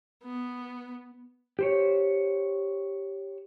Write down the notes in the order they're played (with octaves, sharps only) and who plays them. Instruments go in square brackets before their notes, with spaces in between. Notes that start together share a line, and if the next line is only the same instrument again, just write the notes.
[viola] B3
[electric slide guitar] G4 C5 C#5